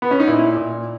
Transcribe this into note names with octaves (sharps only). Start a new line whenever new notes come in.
B3
C#4
D#4
A#2 E4
A#2